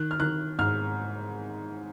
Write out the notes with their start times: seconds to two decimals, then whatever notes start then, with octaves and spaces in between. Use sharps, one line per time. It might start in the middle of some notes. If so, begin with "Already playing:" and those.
Already playing: D#3 F#6
0.11 F6
0.20 D#3 F#6
0.59 G#2 F6